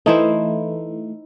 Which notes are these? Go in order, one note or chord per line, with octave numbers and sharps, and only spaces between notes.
E3 A3 D#4 E4 C5